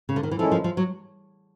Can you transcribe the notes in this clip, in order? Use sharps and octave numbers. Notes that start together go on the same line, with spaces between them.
C#3
D3
D#3
E3
D#3 F3 G#3 C#4 E4 A4
F3
F3
F#3